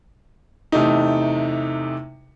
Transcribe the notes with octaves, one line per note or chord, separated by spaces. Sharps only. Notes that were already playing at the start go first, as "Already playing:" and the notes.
E2 C3 A3 D#4